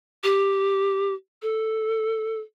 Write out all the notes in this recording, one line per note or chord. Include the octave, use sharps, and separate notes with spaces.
G4
A4